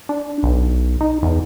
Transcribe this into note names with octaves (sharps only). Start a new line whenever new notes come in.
D4
B1
D#4
E2